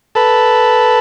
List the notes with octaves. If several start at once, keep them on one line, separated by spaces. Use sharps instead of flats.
A4 B4